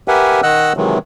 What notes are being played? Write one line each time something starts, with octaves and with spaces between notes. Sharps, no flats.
G4 A#4 B4 E5 F#5 G#5
D#3 D#5 F#5 E6 F#6
C3 D#3 E3 F#3 G#3